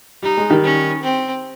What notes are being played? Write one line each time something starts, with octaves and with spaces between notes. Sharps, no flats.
G3 D#4
G#3
D#3 G3
C#4
C4